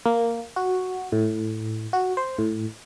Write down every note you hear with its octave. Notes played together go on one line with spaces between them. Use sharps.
A#3
F#4
A2
F#4
C5
A2